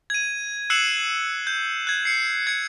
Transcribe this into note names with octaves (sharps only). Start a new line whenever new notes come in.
G#6 D#7
E6 F#6 C7 C#7 E7 F#7
G6
F#6 G#6
C7 C#7
G#6 C#7